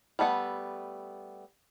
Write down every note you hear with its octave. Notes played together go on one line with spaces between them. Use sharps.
G3 A3 B3 F#5